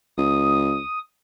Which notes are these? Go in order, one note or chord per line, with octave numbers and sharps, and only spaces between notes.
C#2 D#6